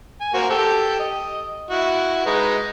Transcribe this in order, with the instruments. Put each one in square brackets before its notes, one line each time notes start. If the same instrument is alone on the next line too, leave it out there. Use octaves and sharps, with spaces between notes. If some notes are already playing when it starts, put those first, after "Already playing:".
[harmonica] G#5
A#3 F#4 C5
G4 A4 G5
D#5
E4 F#4
G#3 D#4 B4